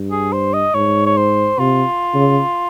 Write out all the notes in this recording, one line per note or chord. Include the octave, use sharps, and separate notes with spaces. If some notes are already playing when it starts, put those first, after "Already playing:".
Already playing: G2
G#4
C5
D#5
G#2 C#5
C#5
C5
C3 F4
C#3